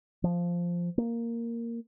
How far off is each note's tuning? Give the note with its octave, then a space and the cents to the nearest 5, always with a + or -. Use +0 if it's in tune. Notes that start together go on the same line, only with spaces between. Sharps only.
F3 -5
A#3 -5